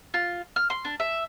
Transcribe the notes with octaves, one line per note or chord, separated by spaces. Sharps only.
F4
F6
C6
D4
E5